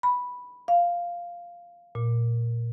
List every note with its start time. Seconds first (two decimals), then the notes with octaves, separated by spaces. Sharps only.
0.03 B5
0.68 F5
1.95 A#2